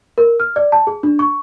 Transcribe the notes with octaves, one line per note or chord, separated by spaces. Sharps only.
A#4
F6
D5
A5
G#4
D4
C#6